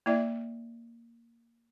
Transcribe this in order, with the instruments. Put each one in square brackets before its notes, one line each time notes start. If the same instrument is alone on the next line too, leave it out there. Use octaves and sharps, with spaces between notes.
[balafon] A#3 E4 D5 E5